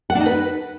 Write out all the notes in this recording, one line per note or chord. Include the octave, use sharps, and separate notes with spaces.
F#5
D4
D#4
B4